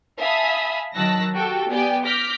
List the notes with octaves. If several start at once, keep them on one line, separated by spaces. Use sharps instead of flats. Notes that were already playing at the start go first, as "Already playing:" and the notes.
E5 F5 G#5 A5 B5 D#6
D#3 F#3 A5 E6 F#6 A#6
F#4 G4 A4 G5
B3 G4 D5 G5 G#5
D6 F6 G6 A#6 B6